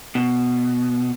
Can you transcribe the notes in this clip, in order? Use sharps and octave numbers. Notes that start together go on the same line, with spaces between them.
B2